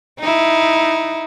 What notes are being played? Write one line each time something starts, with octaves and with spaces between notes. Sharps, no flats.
D#4 E4